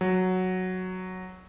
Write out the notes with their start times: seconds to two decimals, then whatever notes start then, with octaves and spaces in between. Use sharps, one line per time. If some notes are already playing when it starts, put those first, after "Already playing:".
0.01 F#3